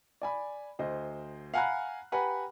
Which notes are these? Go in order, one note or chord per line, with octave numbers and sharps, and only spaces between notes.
D5 G#5 B5
D2 C5 D#5
F5 F#5 G#5 A#5 B5 F#6
G4 B4 F#5 G#5 A#5 B5